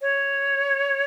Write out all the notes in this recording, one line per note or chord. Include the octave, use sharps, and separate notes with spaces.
C#5